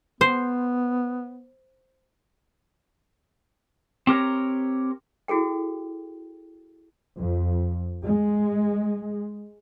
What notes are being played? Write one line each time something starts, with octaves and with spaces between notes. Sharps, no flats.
B3 C5
C4 G4 A#4 C#5
E4 F#4 G#4 A4 G5
F2
G#3